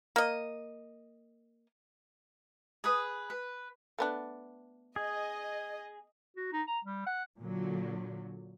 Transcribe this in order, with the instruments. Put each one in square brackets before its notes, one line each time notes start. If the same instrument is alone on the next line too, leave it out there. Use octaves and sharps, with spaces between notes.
[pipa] A#3 D#5
[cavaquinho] G#4 B4 D#6
B4
[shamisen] A3 B3 D4
[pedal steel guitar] G#4 [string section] D#5
[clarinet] F#4
D#4
A#5
G3
F#5
[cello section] A#2 D3 F#3